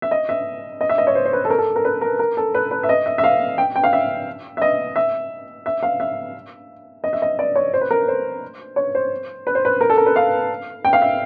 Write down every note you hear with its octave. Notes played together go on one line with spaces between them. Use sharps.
E5
D#5
E5
D#5
E5
D#5
C#5
C5
C5
B4
A4
A#4
A4
A#4
B4
A#4
A#4
A4
B4
B4
E5
D#5
E5
E5
F5
G5
G5
F5
E5
E5
D#5
E5
E5
F5
E5
D#5
E5
D#5
D5
C#5
C5
B4
A#4
C5
C#5
C5
B4
C5
B4
A#4
A4
A#4
B4
F5
G5
F5
E5